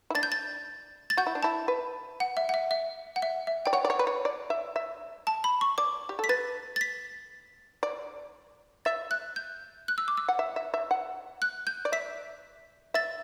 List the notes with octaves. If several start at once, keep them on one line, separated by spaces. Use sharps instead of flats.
E4
D4 A6
G6
A6
A6
F#4 G6
E4
D4
E4 A5
B4
F#5
E5
F#5
E5
E5
F#5
E5
E5
D5 G5
C#5 F#5
D5
C#5
B4
C#5
D5
E5
E5
A5
B5
C#6
D5 D6
G4
A4
B6
B4 A6
A6
B6
D5
E5 A6
F#6
G6
F#6
E6
D6
E6
F#5
E5
E5
E5
F#5
F#6
G6
D5
E5 B6
E5 A6